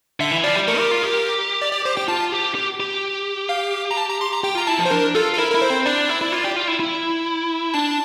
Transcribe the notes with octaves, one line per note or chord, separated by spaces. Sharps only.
D3 E5
E3
F3 D5
G3
A3 A#4
G4
F4
G4
D5
D5
C5
G4 G5
F4 A5
G4
G4
G4
F5
A#5
A5
A#5
C6
A#5
G4 G5
F4 A#5
E4 A5
F3
C5
D4 A#4
F4 A4
A4
E4 A#4
E4 A#4
C5
C4
D4 D5
E4
E4
F4
G4
F4
E4
E4
D4 A5